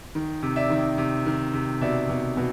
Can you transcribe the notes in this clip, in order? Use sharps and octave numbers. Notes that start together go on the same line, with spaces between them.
D#3
C3
D5 E5
D#3
C3
D#3
C3
B2 D5 E5
B2
B2